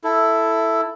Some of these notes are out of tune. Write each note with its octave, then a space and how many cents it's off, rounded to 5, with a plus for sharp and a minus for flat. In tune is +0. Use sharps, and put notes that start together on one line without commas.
E4 +0 A4 +0